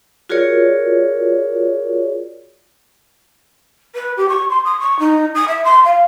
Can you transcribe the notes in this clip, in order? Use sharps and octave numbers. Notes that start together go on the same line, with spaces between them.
F4 F#4 G#4 A#4 C#5 D5
B4
G4
C#6
C6
D#6
C#6
D#4
D#6
E5
C6
F5